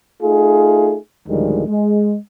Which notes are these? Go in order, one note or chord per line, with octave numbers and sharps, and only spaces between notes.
A3 D#4 F4 G#4
D2 A2 D#3 F3 G3 G#3
G#3